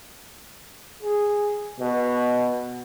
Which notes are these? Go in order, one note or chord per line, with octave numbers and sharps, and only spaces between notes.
G#4
B2